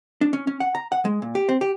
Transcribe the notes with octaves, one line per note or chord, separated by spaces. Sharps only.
D4
C#4
C#4
F#5
A#5
F#5
G#3
A#2
G4
C4
G4